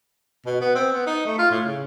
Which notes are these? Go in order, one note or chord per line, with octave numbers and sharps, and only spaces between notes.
B2
B3
C4
B3
D#4
A3
F4
A2
C#3